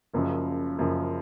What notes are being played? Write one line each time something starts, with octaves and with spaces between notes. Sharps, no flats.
F#1 F#2 C#3 F3
F#1 F#2 C#3 F3